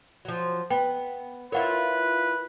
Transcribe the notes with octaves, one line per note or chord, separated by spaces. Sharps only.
F3 F#3
B3 G5
E4 F4 A#4 B4 C#5 F#5